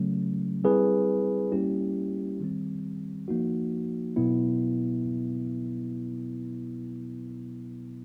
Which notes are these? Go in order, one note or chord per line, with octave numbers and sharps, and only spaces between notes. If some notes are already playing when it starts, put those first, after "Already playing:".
Already playing: C#3 F#3 A3 C#4
G3 C4 E4 G#4 B4
G3 A#3 C#4 E4 G4
D#3 G3 C4
F3 A#3 D#4 F#4
B2 F#3 B3 E4